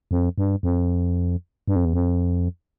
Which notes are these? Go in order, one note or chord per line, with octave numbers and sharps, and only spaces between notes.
F2
G2
F2
G2
F2
E2
F2